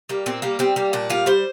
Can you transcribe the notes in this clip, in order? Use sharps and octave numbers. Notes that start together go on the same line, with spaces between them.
G3 A#3
A#2 C4
G3 A#3
G3 C4
G3 A#3
A#2 D4
G3 F4
G3 C5